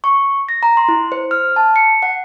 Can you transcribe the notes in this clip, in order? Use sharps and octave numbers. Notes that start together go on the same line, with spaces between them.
C#6
A#6
A#5
C6
E4
C5
F6
A5
C#7
F#5